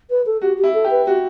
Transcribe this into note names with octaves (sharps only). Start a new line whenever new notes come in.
B4
A4
F#4 G4
G4
E4
A4
G4
B4
F#4 G4